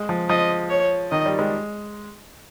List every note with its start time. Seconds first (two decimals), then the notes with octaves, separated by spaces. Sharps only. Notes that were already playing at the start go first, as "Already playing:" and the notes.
Already playing: G#3
0.09 F3
0.29 F3 D#5
0.70 C#5
1.11 D#3 D#5
1.26 G3
1.39 G#3